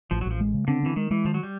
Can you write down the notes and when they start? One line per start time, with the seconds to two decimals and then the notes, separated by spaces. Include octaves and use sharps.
0.11 A1 F3
0.21 F#3
0.26 A1
0.31 F3
0.40 G#3
0.54 C#3
0.68 D3 C4
0.83 E3 C4
0.96 D#3 G#3
1.11 E3 G#3
1.25 D#3 F3
1.34 F#3
1.43 G3